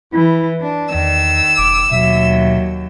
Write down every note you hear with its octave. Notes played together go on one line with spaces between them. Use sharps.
E3 E4
D4 D5
E2 D#3 E6
E1 D6
D#2 B2 F#3 E5